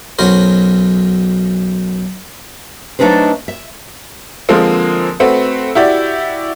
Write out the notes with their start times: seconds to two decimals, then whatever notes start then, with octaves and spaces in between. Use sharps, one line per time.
0.19 B1 F#3 C#4 A#4 C5
2.99 F#3 A3 D4 D#4 B4 C5
3.48 E5
4.49 D3 F3 G#3 A#3 C4
5.20 A3 C4 F#4 B4
5.75 E4 F#4 G4 D5